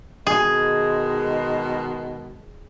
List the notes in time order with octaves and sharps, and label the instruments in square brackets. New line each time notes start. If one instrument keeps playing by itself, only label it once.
[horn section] B2 D#3 G#3 [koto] G#4